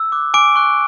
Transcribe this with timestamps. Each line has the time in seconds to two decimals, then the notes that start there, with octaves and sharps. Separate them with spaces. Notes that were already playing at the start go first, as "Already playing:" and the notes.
Already playing: E6
0.12 D6 F#6
0.34 G#5 D6 D7
0.56 C#6 F#6